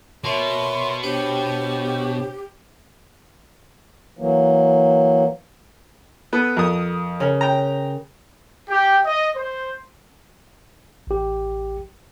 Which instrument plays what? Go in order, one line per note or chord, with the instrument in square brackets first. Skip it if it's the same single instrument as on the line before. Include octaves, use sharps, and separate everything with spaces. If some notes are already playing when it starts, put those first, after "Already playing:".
[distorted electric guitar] B2 [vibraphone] A#4 C#5 E5 [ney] C6
[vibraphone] D4 C5 C#5 [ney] G4
[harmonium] E3 F#3 A#3
[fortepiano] B3 [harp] A4 D#6
[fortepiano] F2 D#6 [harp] A#4
[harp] C#3 A#4
[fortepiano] G5 A#5
[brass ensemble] G4
D#5
C5
[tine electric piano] A1 G4